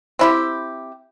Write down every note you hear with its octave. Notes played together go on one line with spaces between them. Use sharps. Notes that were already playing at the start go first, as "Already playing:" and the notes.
C4 E4 G4